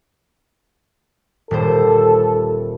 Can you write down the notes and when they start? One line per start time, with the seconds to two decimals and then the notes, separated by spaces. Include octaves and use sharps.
1.51 D#1 G3 A4 C5